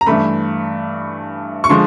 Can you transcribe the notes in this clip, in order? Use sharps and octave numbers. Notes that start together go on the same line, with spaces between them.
A#5
G2 E3 A3 B5
C#6
D3 F3 G#3 C6